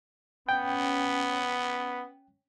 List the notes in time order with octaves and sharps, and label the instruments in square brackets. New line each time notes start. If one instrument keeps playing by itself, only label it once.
[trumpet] B3 [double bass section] C#4 [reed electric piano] G5